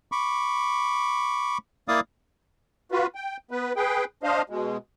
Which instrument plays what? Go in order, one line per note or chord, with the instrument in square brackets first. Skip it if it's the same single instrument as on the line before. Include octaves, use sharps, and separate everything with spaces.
[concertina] B5 C#6 D6
A#3 E4 D5 F5 D#6
[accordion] F4 F#4 B4
G5
B3 B4
G#4 B4 G5
D4 C5 D#5 F5
B2 G#3